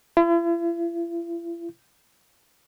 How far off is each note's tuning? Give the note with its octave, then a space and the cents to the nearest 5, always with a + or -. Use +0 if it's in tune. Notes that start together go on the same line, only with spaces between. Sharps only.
E4 +45